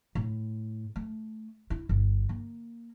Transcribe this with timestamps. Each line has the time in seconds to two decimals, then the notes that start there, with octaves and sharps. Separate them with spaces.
0.15 A2
0.96 A3
1.70 E4
1.89 G1
2.29 A#3